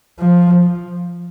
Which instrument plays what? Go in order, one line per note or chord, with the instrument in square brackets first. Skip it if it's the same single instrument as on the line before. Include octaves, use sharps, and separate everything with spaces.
[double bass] F3